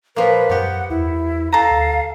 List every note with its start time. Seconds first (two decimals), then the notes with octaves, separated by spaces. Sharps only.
0.16 A#2 F3 A#3 B4
0.49 F#2 B3 G4 F#5
0.90 E2 E4
1.53 A4 F5 A#5
1.71 D2